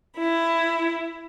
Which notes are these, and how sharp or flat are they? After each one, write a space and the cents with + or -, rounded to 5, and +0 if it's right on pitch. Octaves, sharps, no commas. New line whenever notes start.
E4 +15